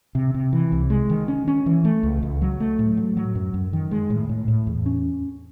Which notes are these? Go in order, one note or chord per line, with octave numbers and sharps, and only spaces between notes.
C3
C3
E3
C2
G#3
D#3
C#4
C#4
E3
A3
C#2
C#2
F#3
A3
A2
F#3
F#3
F#2
F#2
D#3
G#3
A2
A2
A2
E2
C#4